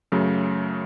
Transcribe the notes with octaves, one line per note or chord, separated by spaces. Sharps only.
F#2 C#3 F#3 A3